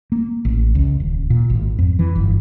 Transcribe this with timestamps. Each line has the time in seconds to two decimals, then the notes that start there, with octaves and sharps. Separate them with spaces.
0.12 A#3
0.45 A1
0.75 C#2
1.00 D#1
1.30 A#2
1.50 G#1
1.79 F2
1.99 E3
2.15 G1